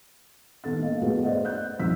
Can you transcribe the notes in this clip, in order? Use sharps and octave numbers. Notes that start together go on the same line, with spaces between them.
D#3 B3 A4 A6
A#3 D#5 F5
A3 B3 F#4 G#4 A4 B4
C5 D5 D#5 F#5
F#6 G6
F2 B2 D#4 E6 B6